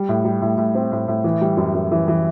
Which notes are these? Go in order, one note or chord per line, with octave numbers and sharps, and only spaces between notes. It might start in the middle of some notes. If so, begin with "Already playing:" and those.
Already playing: G3
A2
G3
A2
A2
C4
A2
A2
E3
G3
F#2
F#2
E3
E3